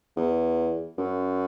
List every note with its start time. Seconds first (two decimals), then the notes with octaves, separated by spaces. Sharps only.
0.17 E2
0.98 F#2